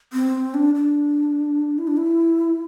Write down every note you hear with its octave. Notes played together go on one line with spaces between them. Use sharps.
C4
D4
D4
E4
D4
E4